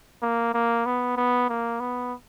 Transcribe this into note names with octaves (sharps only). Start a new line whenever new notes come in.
A#3
A#3
B3
B3
A#3
B3